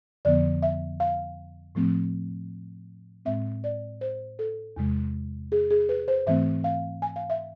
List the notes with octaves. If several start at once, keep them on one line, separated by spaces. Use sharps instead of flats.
F2 D3 F3 B3 D5
E5
F5
A2 F3 A3 C4
A2 G#3 C4 E5
D5
C5
A4
E2 C3 G#3
G#4
G#4
B4
C5
G#2 E3 A3 C4 E5
F5
G#5
F5
E5